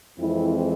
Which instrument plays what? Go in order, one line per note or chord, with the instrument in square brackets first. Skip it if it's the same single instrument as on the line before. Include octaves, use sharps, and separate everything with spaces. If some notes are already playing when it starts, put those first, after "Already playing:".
[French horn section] F2 E3 G#3 C4 E4